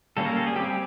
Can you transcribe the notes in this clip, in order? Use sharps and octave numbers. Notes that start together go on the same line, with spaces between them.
G3 A#3 C#4 A4
A#4
A4
G#4
G3 C4 G4